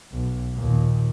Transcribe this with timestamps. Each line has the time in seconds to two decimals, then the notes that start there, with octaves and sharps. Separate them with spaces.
0.12 B1
0.53 D#2 A#2